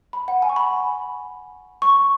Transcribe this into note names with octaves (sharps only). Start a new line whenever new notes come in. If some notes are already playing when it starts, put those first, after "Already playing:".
B5
F#5
G#5
C#6
B5
C#6